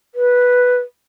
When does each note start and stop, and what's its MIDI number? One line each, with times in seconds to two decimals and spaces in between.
0.15 0.77 71